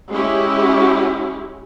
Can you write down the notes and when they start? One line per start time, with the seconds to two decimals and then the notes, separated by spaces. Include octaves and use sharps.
0.11 G#3 C#4 E4 G4